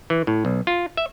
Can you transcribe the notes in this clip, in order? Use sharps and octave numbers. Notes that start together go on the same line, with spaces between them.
E3
A2
B1
F4
E5